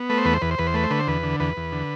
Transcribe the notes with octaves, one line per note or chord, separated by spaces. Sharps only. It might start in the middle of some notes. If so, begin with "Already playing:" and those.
Already playing: B3
A3 B4
C5
E2 B4
C5
E2 B4
C5
E2 B4
C5
A3 B4
C5
D3 B4
C5
E2 B4
D3
E2 B4
E2
D3